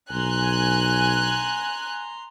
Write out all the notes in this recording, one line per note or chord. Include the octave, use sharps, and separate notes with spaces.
B1 G#5 A#5 C6 F#6